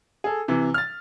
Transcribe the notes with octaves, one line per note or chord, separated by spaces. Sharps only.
G#4 A4
C3 E3
F6 A6